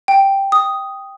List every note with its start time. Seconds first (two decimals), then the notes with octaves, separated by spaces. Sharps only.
0.08 G5
0.52 D#6